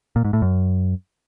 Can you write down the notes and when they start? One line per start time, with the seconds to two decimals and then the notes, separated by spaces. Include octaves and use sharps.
0.16 A#2
0.25 G#2
0.33 A2
0.42 F#2